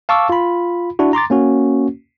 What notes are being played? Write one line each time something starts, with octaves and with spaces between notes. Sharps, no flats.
F5 A5 C#6 D6 E6
F4 B5
D4 E4 F#4
A#5 C6 D6 A6
A#3 C#4 F#4